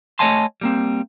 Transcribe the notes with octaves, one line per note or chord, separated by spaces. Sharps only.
A3 C#5 D#5 G#5 A5 C6
G3 A#3 C4